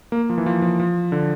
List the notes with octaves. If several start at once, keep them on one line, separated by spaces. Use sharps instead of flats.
A#3
F3
E3
F3
F3
F3
D3